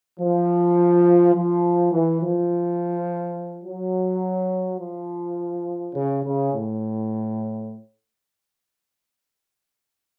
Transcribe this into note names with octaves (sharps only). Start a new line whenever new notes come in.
F3
F3
E3
F3
F#3
F3
C#3
C#3
A2